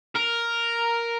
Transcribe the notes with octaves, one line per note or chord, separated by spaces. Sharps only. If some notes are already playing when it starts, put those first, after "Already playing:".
A#4